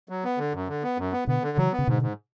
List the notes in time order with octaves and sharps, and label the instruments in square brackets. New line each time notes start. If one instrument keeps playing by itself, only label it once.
[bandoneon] F#3
B3
D3
F#2
D3
B3
F#2
B3
[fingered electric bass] B2 D3 [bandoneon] B3
[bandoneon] D3
[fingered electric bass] C#3 E3 [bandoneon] F#3
[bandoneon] B3
[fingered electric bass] C#3
[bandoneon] G#2 [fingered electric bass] B2 D3
[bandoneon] G#2